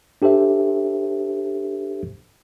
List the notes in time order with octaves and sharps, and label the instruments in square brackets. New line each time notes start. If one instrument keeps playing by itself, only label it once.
[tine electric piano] D4 G4 A4 C5 E5